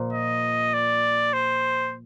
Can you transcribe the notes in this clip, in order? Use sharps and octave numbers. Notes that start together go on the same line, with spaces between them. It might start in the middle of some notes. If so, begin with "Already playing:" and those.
Already playing: A#2 F3 A#3
D#5
D5
C5